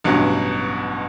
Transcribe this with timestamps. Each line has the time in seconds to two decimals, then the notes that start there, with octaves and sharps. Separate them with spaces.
0.04 A1 G2 B2 F#3